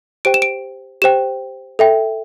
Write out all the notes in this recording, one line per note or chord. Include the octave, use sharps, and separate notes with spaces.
G4 C5 G5 D7
E7
D7
G4 C5 G5 E7
A4 E5 G5